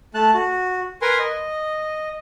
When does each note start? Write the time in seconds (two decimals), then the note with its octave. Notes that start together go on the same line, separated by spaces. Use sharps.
0.14 A3 A5 F#6
0.34 F#4
1.02 A#4 B4 G#5 A#5 C6
1.19 D#5